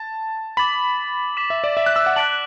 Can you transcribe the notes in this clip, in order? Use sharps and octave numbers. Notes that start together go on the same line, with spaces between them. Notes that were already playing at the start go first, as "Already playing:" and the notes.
Already playing: A5
B5 D6 A6 F#7
D6 B6 E7
E5
D5
E5
F#6
E6
F#5
A5 F#6 B6 D7 F#7